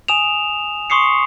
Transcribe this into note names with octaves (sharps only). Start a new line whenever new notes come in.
G#5 D#6 E7 F7
C6 C#6 D#6 C7 C#7